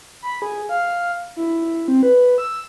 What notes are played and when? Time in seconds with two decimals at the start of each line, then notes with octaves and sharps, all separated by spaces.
0.22 B5
0.42 G#4
0.69 F5
1.36 E4
1.88 C4
2.03 B4
2.38 E6